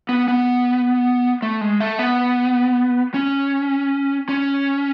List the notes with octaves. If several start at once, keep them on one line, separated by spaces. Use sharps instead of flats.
B3
B3
A3
G#3
A3
B3
C#4
C#4